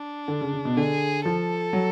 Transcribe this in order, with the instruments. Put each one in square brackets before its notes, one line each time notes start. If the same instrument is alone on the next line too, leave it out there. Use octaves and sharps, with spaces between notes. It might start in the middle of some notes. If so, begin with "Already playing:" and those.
Already playing: [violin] D4
[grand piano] D3
C#3
C#3
B2
[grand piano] D3 [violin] G#4
[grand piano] F3 [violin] A4
[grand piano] F#3